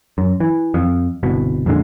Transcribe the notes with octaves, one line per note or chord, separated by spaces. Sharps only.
F#2
E3
F2
G1 C2 B2
F2 A#2 D3 G#3